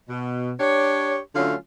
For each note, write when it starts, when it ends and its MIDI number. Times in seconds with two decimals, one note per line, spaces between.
0.08 0.51 47
0.59 1.17 62
0.59 1.17 67
0.59 1.17 73
1.35 1.54 50
1.35 1.54 54
1.35 1.54 57
1.35 1.54 61
1.35 1.54 65